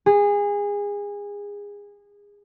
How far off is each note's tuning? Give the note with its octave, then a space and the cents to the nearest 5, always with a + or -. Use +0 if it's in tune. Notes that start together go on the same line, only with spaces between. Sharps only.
G#4 -25